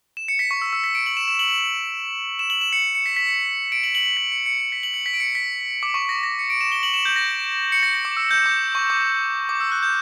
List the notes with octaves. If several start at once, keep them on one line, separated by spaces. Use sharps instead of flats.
E7
C#7
B6
C#6
E6
E6
B6
D7
F#7
E7
E7
F#7
E7
E7
F#7
E7
C#7
C#7
B6
B6
C#7
D7
F#7
F#7
F#7
B6
C#7
C#7
C#7
B6
F#7
C#7
B6
D7
C#7
B6
D6
C#6
A#6
A#6
C#7
D7
E7
G7
F#7
E7
G6
A#6
C#7
A#6
A#6
D6
E6
G6
D6
C#6
D6
D6
E6
F#6
G6